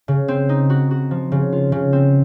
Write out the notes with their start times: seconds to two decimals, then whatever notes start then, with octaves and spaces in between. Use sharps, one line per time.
0.08 C#3
0.28 C4
0.49 D#4
0.70 F#4
0.91 F#4
1.11 F3
1.32 C#3
1.52 F4
1.72 C#3
1.93 C4